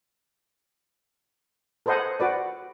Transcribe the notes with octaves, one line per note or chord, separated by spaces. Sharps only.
A4 B4 C5 D#5 F#5 G#5
F#4 B4 D5